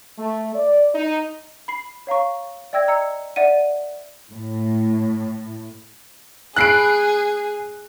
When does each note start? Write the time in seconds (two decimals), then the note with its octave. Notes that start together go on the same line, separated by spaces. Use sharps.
0.18 A3
0.54 D5
0.94 D#4
1.68 B5 C7
2.07 C#5 F5 A#5 C#6
2.73 D5 E5 G5 E6 G#6 A#6
2.88 D#5 A#5 E6 G#6 C#7
3.36 D5 E5 F#5 D#7
4.32 A2
6.56 A3 E4 G#4 A4 F#6 C7 D7